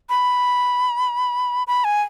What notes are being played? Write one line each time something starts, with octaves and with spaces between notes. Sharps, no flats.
B5
B5
G#5